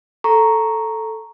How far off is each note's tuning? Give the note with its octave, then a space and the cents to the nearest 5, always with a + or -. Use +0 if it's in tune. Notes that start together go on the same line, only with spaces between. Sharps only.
A4 +0 A#5 +0 C#6 +0